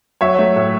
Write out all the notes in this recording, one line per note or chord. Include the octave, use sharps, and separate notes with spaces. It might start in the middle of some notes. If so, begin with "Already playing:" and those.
F#3 C#5 E5
A3
A2